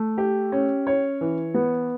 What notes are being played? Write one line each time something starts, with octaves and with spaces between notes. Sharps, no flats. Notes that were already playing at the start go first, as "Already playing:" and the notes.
Already playing: A3
G4
C#4
C#5
E3
B3